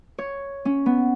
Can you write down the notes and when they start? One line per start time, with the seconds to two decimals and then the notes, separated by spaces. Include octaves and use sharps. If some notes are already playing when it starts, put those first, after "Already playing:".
0.18 C#5
0.65 C#4
0.86 B3